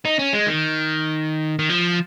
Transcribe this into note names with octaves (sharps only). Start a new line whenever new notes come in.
D#4
C#4
G#3
D#3
D#3
F3